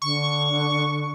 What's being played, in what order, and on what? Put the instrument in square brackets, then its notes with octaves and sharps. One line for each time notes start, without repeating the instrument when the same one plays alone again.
[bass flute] D3 [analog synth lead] C#6